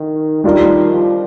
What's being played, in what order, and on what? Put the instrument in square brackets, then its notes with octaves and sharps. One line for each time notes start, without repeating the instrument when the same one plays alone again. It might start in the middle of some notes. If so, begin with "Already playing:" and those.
Already playing: [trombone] D#3
[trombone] D#3 [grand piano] G3 D4 F4 A#4
[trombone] F3